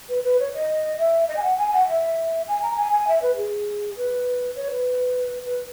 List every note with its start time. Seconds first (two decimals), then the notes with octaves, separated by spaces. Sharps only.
0.09 B4
0.24 B4
0.39 C#5
0.53 D#5
0.98 E5
1.28 D#5
1.36 G#5
1.43 F#5
1.58 G#5
1.73 F#5
1.88 E5
2.48 G#5
2.62 A#5
2.77 G#5
2.92 G#5
3.08 E5
3.22 B4
3.37 G#4
3.97 B4
4.55 C#5
4.71 B4
5.46 B4